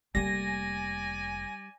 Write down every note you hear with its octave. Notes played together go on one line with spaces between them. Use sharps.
F1 G3 A#3 D5 G#5 A#6